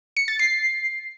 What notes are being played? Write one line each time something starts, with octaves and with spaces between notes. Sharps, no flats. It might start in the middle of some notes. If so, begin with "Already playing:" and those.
C#7
A6
C7